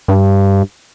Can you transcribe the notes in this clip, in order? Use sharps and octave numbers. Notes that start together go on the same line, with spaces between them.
G2